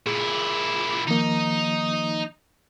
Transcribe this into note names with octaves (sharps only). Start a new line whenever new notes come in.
A#2 E4 G#4
D#3 F3 A#3 D#4